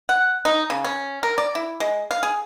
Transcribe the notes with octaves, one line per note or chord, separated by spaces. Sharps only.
F#5
D#4
C#3
C#4
A#4
D5
E4
G#3
F5
G#4